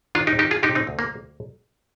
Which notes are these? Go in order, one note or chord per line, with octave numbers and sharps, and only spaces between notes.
D#3 D4 F4
D#4 G4
D#3 D#4 G4
F4 G#4
C3 D#4 G4
C4 D#4
D2
A#3